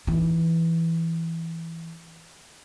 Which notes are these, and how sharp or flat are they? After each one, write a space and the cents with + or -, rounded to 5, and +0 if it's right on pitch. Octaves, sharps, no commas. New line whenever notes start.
E3 +0 D#4 +0